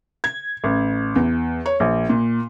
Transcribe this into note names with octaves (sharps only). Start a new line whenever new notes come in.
G#6
A1
E2
C#5
A#1
A#2